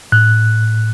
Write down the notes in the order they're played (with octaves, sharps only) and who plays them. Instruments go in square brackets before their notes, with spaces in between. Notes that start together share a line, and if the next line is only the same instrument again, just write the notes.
[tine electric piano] A2 F#6